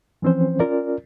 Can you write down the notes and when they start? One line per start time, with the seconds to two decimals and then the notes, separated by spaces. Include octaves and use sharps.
0.22 E3 F3 C4 C#4 C5
0.60 C#4 F4 A#4 D5